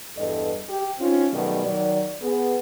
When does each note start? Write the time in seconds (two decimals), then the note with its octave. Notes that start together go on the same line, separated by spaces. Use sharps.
0.17 E2 G2 A4 D#5
0.68 G4
0.99 C4 C#4 D#4 F4
1.32 B2 D#3 F#3 G3 A3
1.64 D#3 F#3 D5
2.22 B3 G#4